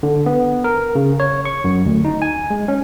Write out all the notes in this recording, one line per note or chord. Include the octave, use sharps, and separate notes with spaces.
D3
B3
A#4
C#3
C#5
C#6
F#2
D2
D#4
G#5
G#3
C#4